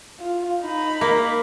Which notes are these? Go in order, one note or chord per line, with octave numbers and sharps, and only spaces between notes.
F4
D#4 B5
A#3